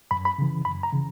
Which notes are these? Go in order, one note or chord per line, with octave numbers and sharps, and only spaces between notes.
F#2 B5
B5
C#3 E3
F#2 B5
A#5
C#3 E3